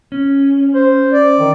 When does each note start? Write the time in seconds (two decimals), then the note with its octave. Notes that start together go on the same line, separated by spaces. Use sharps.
0.12 C#4
0.75 C5
1.12 D5
1.40 D#3